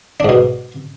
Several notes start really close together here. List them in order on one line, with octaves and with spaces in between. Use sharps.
D4 G#2 B2